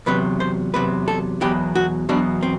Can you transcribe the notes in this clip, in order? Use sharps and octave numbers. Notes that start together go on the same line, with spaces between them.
E2 C3 F#3 B4
C5
E2 C3 F#3 B4
A4
E2 B2 F#3 G4
F#4
E2 B2 F#3 D4
C4